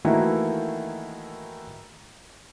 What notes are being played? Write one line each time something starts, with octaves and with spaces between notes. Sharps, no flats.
D#3 E3 A3 A#3 E4 F#4